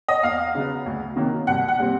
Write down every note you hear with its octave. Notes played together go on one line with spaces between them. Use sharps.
D#5
E2 F5
C#3 F#3 B3
D2
C3 D#3 F#3 A#3
C2 F#5
F#5
A#2 G3 C4